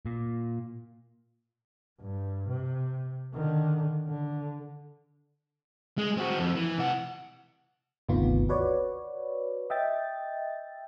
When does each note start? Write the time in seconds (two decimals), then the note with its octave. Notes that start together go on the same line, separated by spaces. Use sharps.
0.06 A#2
2.01 G2
2.49 C3
3.34 D3 D#3
4.09 D3
5.98 G#3
6.17 C4 F#4
6.39 F2
6.56 E3
6.78 C3 F#5
8.09 G1 D2 C3 D#3 B3 F4
8.49 F#4 B4 C#5 D5
9.70 D#5 E5 G5 A6